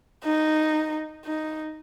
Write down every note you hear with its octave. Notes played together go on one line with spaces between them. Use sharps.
D#4
D#4